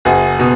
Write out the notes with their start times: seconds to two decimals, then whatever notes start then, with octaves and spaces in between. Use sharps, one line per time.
0.05 F#1 F#4 G#4
0.39 B2